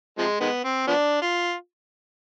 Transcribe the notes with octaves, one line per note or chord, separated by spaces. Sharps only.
C3 F3 G#3
D#3 G#3 B3
C4
F3 B3 D4
F4